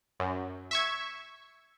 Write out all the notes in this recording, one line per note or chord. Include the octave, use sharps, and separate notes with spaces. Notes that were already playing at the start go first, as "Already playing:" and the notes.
F#2
E5 C#6 G#6